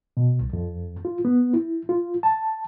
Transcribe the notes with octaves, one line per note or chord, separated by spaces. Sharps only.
B2
C2
F2
F4
B3
E4
F4
A5